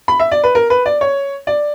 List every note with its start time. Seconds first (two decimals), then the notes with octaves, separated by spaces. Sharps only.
0.08 B5
0.20 E5
0.31 D5
0.44 B4
0.55 A#4
0.70 B4
0.86 D5
1.01 C#5
1.47 D5